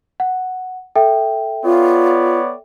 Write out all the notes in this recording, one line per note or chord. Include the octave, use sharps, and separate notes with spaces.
F#5
A4 E5 G5
B3 F4 C#5 D5